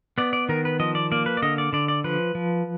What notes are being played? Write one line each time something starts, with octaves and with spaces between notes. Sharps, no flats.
B3 D5
D5
D#3 A#4
B4
F3 D#5
D5
A#3 D5
B4
D5
D3 D#5
D5
D3 D5
D5
F3 B4
F3